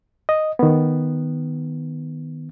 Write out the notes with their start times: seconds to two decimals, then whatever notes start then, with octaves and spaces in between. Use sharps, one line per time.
0.29 D#5
0.59 D#3 B3